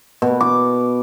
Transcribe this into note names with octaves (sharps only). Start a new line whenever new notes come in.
B2
D6